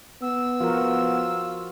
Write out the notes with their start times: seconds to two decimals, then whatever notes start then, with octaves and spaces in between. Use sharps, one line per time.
0.22 B3 E6
0.61 F3 F4 F#4 A#4